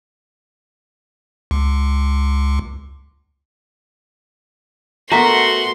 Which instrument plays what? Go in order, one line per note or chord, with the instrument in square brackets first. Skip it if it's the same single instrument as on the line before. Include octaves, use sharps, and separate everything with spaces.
[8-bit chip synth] C#2
[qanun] A3 B3 A#4 [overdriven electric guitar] F#4 [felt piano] A#5 B6 [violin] C6